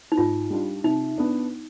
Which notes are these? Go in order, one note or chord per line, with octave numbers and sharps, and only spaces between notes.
D#4
G#2 F4
G3 D4 F4
C3 D#4
B3 D4